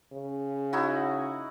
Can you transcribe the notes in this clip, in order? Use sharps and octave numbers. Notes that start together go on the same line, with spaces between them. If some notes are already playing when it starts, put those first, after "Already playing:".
C#3
D#4 E4 F#4